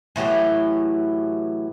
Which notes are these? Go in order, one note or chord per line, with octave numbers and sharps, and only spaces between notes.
A2 E3 F#3 G4